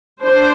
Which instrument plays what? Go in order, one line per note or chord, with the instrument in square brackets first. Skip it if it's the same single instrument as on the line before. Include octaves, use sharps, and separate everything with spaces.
[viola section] D4 C5